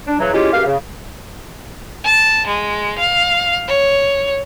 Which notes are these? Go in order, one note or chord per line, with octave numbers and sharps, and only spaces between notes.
D4
C#3 E3 F#3
G#3 C#4 E4 F4 G4
C#2 F#2 G4 F5
C#3
A5
G#3
F5
C#5